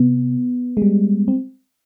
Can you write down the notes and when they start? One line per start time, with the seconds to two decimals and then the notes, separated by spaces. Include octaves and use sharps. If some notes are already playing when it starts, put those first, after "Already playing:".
Already playing: C3 B3
0.77 G#3
0.82 G3
1.28 C4